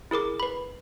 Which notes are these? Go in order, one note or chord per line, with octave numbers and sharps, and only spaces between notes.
E4 G#4 A#4 D6
B4 B5